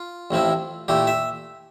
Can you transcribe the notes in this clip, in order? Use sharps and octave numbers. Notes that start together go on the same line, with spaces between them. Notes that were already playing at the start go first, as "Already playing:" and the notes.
Already playing: F4
A1 A2 F3 C4 E4
A#2 A3 E4 G4
E5